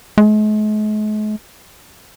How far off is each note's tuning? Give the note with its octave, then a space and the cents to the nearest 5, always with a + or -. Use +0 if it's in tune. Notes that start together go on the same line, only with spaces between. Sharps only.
G#3 +45